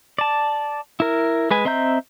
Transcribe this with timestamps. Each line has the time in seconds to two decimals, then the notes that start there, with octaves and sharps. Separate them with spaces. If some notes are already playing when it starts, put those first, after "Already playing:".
0.18 D5 A5
1.00 E4 A#4
1.51 G#3 B4 G#5
1.65 C4 D#5 E5 A#5 G6